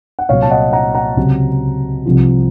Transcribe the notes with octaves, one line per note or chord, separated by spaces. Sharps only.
F#5
C2 A#2 F#3 C#5 F5
A5
D#5 F#5
F#5 A#5
F#5 A#5
C#2 C3 F#3
C2 C3 F3